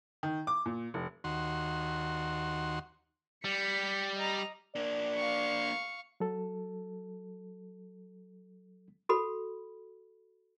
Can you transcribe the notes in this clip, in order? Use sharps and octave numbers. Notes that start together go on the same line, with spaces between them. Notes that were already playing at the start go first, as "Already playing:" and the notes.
D#3
D6
A#2
F1
D#2 F#4 C6
G3 B6 C#7
D#5 A#5
A#3 D4 D5
F5 C#6
F#3 A4
F#4 A4 B5